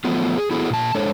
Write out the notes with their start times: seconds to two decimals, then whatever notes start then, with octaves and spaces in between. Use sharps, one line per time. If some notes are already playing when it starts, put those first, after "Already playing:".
0.05 F3 F#3 A3 B3 F4
0.38 G#4
0.51 B3 E4 F#4 G#4 A4
0.70 A#2 A5
0.95 G#3 D4 A4 C5 C#5